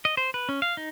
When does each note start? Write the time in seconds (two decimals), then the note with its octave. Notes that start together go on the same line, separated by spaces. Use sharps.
0.05 D#5
0.17 C5
0.34 B4
0.49 C#4
0.62 F5
0.77 D#4